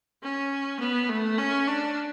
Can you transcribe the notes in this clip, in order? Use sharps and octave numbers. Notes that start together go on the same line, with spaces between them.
C#4
B3
A3
C#4
D4